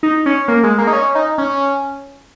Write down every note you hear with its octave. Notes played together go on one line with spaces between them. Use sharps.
D#4
C#4
A#3
G#3
A#3
D#4
C#4
D#4
C#4